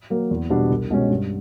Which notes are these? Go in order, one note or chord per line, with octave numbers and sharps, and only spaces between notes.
F#3 A#3
E2
B2 G3 B3 D4
C2
B2 G#3 C#4
G2